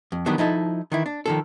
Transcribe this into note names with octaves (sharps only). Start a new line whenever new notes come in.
F2
D#3 E3 F#3 G3 B3 D4
F3 D#4 E4 A4
D#3 E3 E4
D4
D#3 F3 A4